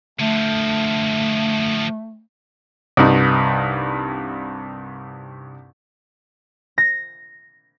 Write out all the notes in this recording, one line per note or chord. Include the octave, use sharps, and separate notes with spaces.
D3 F3 A3
C2 G2 D#4
A#6